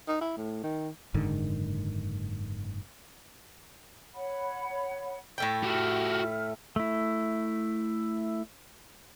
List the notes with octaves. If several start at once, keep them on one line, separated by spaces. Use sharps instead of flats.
D#4
E4
A2
D#3
F#1 G#2 D3 D#3
C#5 F#5 B5
A2 A3 G5 C#6
F#4 G4 E5 F6
A3 E4